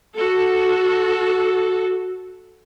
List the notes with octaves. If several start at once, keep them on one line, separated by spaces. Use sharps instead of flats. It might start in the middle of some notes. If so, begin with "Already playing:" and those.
F#4 A4